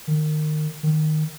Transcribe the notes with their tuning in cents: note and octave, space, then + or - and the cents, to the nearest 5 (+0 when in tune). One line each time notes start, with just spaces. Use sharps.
D#3 -25
D#3 -10